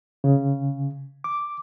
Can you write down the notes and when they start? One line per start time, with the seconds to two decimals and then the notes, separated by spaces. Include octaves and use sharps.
0.24 C#3
1.24 D6